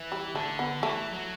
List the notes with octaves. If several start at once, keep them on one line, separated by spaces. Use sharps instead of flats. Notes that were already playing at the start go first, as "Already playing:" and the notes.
Already playing: E3
G3
D3 A3
B3
E3 A3
F#3